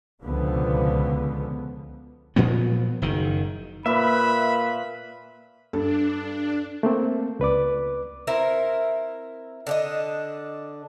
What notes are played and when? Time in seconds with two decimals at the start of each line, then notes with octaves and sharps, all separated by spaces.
0.23 C#2 B2 D3 F3 B3
2.36 A#2 F3 F#3 B3
3.02 F#1 D#3
3.86 A#2 A#3 B4 E5 B5
5.73 G2 D4 A4
6.83 A3 A#3 C4
7.39 C#2 B4 D5 D6
8.27 C4 E4 A#4
9.67 D3 D4 D#5